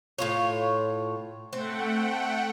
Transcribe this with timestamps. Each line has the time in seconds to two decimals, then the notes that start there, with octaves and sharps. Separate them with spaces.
0.18 A2 F4 C#5
1.53 A3 C4 F#5 G5